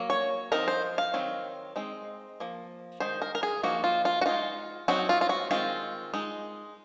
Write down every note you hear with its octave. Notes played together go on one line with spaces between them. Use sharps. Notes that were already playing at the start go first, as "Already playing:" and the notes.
Already playing: F#3 A#3
C#5
F3 C4 D#4 A#4
C5
F5
D#3 F#3 C4
G#3 C4 D#4
F3 A#3
D#3 G#3 D#4 C5
A#4
A#4
G#4
F3 A#3 D#4 F#4
F4
F4
F#4
G#3 D#4 F4
F#3 C4 D#4 F#4
F4
F4
F#4
D#3 G#3 C4 F4
G#3 D#4